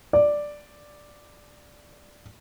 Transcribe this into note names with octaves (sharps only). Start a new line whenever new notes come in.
D5